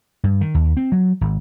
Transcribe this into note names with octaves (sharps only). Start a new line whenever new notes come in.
G2
D#3
D#2
C4
F#3
G#1